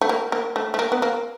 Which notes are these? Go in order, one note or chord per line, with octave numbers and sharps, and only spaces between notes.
A3
A#3
A#3
A3
A3
A#3
B3
A#3